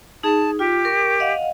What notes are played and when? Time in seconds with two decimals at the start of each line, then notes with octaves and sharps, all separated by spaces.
0.23 D#4 G#4 A5
0.59 F4 G4
0.85 A#4 C#6
1.20 D#5 F5 F#5